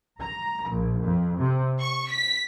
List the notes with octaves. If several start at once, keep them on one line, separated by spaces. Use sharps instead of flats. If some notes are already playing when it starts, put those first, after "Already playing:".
A#5
A#1
F2
C3
C#6
B6